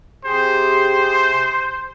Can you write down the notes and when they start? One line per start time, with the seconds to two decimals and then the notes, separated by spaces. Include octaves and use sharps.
0.25 C3 G4 G#4 C5